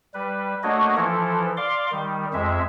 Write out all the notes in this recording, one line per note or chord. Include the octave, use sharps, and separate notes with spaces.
G3 B4
A3 A#3 D4 F#4 C#5 D#5
E3 F3 E4 A4
D5 F5 C6 D6
D#3 G3
F2 G#3 E5